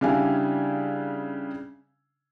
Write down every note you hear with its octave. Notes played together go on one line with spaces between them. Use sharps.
C#3 G3 D4 E4 F5 G#5